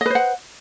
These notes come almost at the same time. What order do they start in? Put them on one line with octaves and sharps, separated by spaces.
D#5 B4 C5 F#5